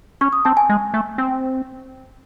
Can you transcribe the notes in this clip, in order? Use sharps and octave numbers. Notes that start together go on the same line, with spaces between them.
C#4 C#6
D#6
C4 A5
G#5
G#3
A3
C4